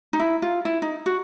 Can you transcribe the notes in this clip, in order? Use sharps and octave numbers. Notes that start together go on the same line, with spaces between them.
D#4
E4
F4
E4
D#4
F#4